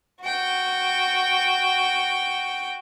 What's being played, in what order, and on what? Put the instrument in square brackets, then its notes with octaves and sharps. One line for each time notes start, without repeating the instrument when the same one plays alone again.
[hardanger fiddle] F#4 G5